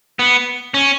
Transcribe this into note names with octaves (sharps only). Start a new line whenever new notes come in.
B3
C#4